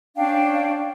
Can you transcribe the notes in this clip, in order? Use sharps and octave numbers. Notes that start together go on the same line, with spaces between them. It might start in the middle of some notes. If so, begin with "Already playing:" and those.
C#4 D4 F5 G5